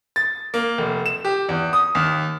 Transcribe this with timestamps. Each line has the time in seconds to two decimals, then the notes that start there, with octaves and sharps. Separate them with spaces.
0.16 A6
0.54 A#3
0.78 F1
1.06 E7
1.25 G4
1.49 E2
1.73 D#6
1.95 D#2